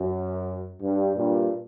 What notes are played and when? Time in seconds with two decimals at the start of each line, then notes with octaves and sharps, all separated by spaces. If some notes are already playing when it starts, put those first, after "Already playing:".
Already playing: F#2
0.81 G2
1.16 G2 A#2